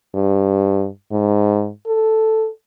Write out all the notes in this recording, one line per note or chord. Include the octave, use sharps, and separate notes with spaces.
G2
G#2
A4